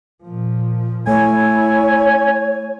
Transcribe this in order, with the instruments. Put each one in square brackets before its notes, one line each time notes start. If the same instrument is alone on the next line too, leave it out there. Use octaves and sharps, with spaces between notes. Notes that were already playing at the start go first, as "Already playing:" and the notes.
[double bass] A#2 F3
[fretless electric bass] A3 [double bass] E4 [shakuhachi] C#5 [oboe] G#5